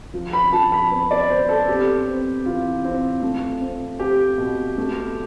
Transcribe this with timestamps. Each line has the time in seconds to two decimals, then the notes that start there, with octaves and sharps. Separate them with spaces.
0.14 F3
0.33 B5
0.53 F3 A5
0.72 B5
0.91 B3
1.11 D5
1.29 B3 C5
1.49 A4
1.68 C4 G4
2.07 C4
2.46 E3 F4
2.84 C4
3.22 A3
3.61 C4
3.99 C4 G4
4.38 B2
4.78 A3